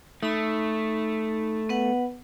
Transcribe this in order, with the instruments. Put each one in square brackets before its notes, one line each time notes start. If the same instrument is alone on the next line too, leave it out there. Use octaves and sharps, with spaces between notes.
[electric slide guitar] A3 [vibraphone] D#4 B5
[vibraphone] B3 B4 F#5